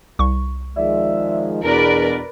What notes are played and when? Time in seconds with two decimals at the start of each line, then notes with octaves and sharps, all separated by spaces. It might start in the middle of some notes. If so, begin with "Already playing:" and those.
0.19 C2 C#6
0.77 D#3 F3 G#3 D5 E5
1.64 E2 B2 D4 A#4 B4 D5